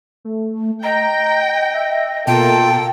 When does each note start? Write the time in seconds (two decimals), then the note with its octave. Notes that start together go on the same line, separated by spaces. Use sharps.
0.25 A3
0.83 D#5 G5 A#5
1.74 E5
2.27 B2 A#3 F4 A4 G5